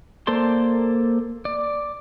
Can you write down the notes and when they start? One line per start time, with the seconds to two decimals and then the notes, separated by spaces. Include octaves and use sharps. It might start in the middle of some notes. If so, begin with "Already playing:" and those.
0.27 A#3 A4 C5 D5 C6
1.45 D5